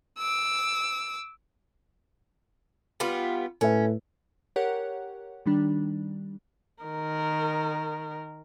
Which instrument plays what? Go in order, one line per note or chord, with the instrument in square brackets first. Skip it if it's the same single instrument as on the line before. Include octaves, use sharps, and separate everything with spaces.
[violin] D6 E6
[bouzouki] G3 B3 F4
[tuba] A2 [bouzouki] C#4 [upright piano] A4 B4 E5
[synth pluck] G4 A#4 C#5 F#5
D#3 G3 D4
[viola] D#3 A#4